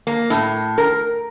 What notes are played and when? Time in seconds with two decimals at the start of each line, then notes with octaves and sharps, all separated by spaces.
0.07 A#3
0.30 A2
0.78 A#4